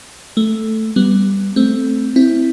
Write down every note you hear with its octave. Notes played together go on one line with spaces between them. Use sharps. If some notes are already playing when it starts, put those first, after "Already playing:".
A3
G3 B3
A3 C4
C4 E4